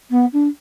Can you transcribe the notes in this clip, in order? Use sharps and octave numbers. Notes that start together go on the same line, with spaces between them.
B3
D4